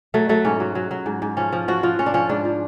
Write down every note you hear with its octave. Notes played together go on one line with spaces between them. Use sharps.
F#3 A3
F#3 A3
G#2 C#4
F#3
F#3
F#3
G#2
G#2
F3 C#4
F3
F3 F#4
F3 F4
F3 C#4
D4
F3 C#4
G#2 D4
F3